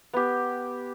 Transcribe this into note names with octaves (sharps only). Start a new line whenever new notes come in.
B3 G4